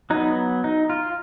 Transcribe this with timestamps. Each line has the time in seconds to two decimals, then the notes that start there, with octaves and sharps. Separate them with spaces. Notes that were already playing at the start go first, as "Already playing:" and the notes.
0.10 F#3 B3 D#4
0.64 D#4
0.90 F4